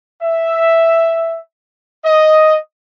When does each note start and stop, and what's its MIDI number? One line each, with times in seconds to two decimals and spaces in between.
0.23 1.40 76
2.05 2.57 75